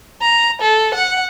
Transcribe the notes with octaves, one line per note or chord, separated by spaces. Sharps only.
A#5
A4
F#5